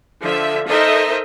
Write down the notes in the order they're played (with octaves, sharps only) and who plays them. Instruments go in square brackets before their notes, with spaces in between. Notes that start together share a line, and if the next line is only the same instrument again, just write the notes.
[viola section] D3 F3 E5
D#4 A4 A#4 C5 D#5 E5